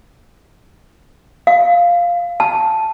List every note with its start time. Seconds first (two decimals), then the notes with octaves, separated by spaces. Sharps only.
1.47 F5
2.40 A5